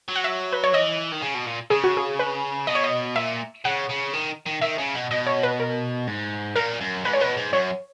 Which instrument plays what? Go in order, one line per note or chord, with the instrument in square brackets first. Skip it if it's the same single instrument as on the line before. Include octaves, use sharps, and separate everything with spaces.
[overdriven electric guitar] F#3
[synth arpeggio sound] F#5
E5
B4
C#5
[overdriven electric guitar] E3 [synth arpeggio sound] D#5
[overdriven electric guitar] D#3
C#3
B2
A#2
[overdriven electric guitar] C#3 [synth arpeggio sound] G#4
[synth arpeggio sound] F#4
G#4
B4
[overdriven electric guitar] B2 [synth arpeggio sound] D#5
[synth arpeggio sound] C#5
D#5
[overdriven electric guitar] A#2 [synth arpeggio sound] E5
[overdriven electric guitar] C#3 [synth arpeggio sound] F#5
[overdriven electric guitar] C#3
D#3
D#3
[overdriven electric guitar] D#3 [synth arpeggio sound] E5
[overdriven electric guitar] C#3
B2
[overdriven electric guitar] B2 [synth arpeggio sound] D#5
[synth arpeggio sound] C#5
B4
A#4
[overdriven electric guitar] G#2
[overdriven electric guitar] A#2 [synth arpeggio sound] A#4
[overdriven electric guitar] F#2
[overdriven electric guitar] G#2 [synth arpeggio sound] B4
[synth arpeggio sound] C#5
[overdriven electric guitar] B2 [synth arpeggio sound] B4
[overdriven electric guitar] G#2
[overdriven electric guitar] F#2 [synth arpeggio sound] C#5